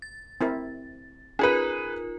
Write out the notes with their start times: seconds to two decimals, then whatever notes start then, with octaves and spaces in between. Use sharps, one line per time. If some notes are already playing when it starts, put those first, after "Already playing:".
0.02 A6
0.41 C4 E4 A#4
1.39 C#4 D#4 F4 G#4 A#4 B4